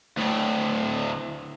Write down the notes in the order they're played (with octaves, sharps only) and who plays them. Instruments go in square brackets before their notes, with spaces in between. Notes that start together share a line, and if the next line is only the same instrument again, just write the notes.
[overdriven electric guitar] D2 A2